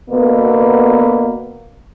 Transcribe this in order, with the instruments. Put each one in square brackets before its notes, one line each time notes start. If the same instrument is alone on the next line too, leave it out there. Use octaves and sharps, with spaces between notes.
[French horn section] B2 D3 A#3 B3 B4